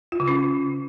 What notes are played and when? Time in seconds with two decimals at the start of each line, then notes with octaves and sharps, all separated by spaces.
0.12 F4
0.20 C#3
0.28 C#4